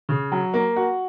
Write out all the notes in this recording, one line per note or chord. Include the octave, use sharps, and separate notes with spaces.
C#3
F#3
A#3
F#4